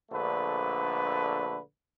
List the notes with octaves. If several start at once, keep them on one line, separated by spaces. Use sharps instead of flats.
A#1 D3 A3 B4